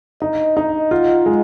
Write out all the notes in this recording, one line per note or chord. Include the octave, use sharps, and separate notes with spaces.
D#4 D#5
D#4
F4 F#5
G#3